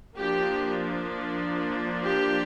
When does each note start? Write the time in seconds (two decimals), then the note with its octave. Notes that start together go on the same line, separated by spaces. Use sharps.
0.17 F3 A#3 D4 G4
2.02 G4